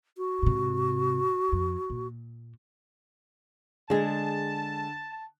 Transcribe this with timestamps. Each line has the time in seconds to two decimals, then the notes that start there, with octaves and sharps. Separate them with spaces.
0.18 F#4
0.42 G#2 C3
1.52 F2
1.90 A#2
3.90 D3 G#3 G#4 A5